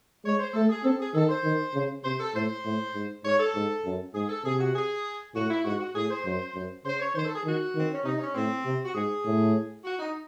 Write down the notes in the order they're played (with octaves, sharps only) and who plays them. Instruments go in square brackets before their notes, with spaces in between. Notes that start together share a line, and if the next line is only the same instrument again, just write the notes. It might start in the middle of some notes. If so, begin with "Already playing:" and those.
[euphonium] G#3 [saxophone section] C#5
[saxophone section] C5
[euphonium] A3 [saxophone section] A4
[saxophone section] G#4
[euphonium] C4 [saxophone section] A4
[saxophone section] G#4
[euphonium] D#3 [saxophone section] A4
[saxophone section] C5
[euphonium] D#3
C#3
[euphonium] C3 [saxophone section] C5
[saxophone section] A4
[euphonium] A2 [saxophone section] C5
[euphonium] A2
G#2
[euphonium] G#2 [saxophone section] C#5
[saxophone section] A4
[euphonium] G#2
F#2
[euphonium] G#2 [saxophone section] G#4
[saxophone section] A4
[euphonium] C3 [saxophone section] G#4
[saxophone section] F#4
G#4
[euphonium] A2 [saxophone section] F#4
[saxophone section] E4
[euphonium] G#2 [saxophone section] F#4
[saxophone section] F#4
[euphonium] A2 [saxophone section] G#4
[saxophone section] C5
[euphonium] F#2
F#2
[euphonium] C#3 [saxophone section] C5
[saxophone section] C#5
[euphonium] D#3 [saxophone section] C5
[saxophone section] A4
G#4
[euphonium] D#3 [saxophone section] F#4
[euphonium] D#3 [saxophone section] C4
[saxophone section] C#4
[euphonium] C3 [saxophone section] D#4
[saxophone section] C#4
[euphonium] A2 [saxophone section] C4
[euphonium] C3
[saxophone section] F#4
[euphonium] G#2 [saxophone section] G#4
[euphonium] A2
[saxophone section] F#4
D#4